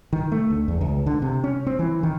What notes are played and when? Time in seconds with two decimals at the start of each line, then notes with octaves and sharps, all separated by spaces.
0.13 D#3
0.32 A3
0.50 D2
0.68 E2
0.81 C#2
1.06 D3
1.22 C3
1.44 C#4
1.67 C4
1.79 E3
2.03 D#3